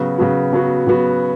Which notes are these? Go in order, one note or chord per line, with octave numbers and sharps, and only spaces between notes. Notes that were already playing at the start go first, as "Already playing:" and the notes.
Already playing: C#3 F#3 B3 F#4
C#3 F#3 B3 F#4
C#3 F#3 B3 F#4
C#3 F#3 B3 F#4